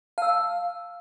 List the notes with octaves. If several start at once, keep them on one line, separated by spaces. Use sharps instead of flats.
F5 A5 E6